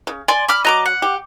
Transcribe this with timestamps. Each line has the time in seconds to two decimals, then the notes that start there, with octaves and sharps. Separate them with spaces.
0.07 C#3
0.28 D5 G#5 C6
0.48 B5 D6 F6
0.65 F#3 D#5 A#5 D6
0.86 F#5
1.02 G4